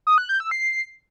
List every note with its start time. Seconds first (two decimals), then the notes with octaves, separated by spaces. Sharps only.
0.07 D#6
0.18 F#6
0.29 G6
0.40 E6
0.51 C7